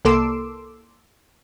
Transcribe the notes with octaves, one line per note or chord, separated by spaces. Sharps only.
C2 A#3 A4 C6 D6 E6